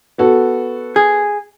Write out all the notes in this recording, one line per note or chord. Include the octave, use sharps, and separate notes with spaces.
B3 F#4 A4
G#4